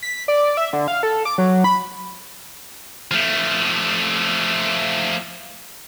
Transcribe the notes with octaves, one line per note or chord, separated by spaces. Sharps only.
B6
D5
E5
D3
F5
A4
D6
F#3
B5
F3 A3